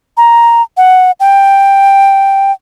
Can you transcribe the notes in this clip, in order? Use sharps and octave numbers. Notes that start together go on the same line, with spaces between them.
A#5
F#5
G5